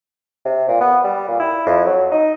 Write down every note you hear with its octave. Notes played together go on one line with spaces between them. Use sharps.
C3
A#2
B3
G3
A#2
E4
F2
F#3
D#4